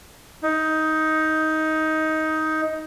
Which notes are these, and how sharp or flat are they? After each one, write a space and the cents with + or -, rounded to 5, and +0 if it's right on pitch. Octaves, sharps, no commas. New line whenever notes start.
D#4 +15